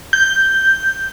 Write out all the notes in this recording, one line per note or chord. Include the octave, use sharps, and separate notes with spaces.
G6